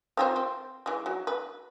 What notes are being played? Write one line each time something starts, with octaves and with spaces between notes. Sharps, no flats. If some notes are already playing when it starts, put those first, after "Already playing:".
C4 F4 C5
C4
E3 G#3
F#3
B4